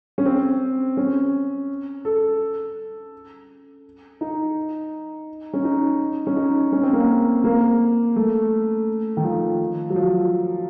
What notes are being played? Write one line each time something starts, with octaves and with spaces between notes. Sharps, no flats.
C#4
C4
C#4
A4
D#4
C#4
D#4
C#4
D#4
C#4
C4
A#3
C4
A#3
A3
D#3
F3
F#3
F3